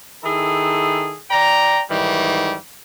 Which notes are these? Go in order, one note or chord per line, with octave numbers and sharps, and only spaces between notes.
D#3 E4 G#4 A4
D5 G5 A#5
G#2 D#3 E3 G3